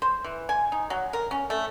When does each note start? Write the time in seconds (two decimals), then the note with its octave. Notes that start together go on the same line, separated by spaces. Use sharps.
0.02 C5
0.24 E3
0.49 G#5
0.72 D#4
0.90 F#3
1.13 A#4
1.31 C#4
1.50 A3